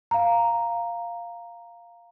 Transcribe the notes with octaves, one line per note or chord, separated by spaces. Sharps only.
F5 A#5